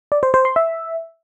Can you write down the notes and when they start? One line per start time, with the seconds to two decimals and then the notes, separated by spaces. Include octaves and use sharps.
0.12 D5
0.23 C5
0.34 C5
0.45 C6
0.56 E5